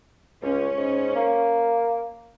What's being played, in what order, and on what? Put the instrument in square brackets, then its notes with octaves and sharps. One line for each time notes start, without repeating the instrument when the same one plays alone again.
[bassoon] C#2 [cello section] C#4
[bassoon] G#2
A#3